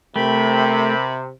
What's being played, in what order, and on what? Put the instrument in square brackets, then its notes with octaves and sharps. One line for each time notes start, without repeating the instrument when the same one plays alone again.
[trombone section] C3 [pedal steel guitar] A3 [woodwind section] A#4 G5 B5